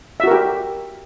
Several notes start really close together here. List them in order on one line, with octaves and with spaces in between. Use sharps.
E5 F#4 A#4 G4